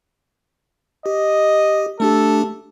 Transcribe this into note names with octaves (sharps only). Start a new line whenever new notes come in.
G4 D#5
A3 D4 G4 A4